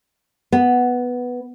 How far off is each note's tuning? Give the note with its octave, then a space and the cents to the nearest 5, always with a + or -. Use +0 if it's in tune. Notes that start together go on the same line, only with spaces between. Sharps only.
B3 +0